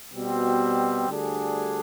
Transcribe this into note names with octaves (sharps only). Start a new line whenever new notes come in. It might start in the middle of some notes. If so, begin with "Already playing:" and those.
B2 G3 C4
D2 D3 G3 D4 G#4